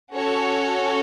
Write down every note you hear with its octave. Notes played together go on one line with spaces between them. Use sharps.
C#4 F#4 A4 C#5